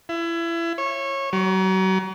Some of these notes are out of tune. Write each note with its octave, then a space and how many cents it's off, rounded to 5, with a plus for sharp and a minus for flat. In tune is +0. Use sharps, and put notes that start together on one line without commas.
E4 +30
C#5 -20
F#3 +40